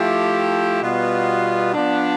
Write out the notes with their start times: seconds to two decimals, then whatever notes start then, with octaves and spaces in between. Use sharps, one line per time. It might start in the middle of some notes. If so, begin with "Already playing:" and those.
Already playing: F3 A3 E4 G4
0.82 B2 G3 B3 F4
1.73 F3 B3 D4